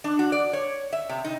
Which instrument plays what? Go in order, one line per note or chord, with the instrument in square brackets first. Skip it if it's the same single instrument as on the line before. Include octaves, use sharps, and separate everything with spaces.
[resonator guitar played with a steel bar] D4
F#4
D5
C#5
E5
C3
D#4